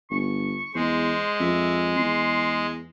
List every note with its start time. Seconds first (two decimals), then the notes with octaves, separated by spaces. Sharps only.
0.11 G1 C#6
0.75 E2 G#3 C5
1.40 F2 E5
1.97 E2 C6